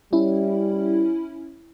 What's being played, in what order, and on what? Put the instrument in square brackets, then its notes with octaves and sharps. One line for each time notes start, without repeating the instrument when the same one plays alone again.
[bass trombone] G3 [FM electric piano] C#4 E4